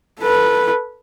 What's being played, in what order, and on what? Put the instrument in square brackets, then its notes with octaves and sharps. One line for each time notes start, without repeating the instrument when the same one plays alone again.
[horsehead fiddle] A4 B4